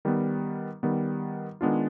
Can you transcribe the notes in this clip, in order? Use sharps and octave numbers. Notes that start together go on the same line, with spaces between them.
D#3 G3 B3
D#3 G3 B3
D#3 G#3 B3 D4 F4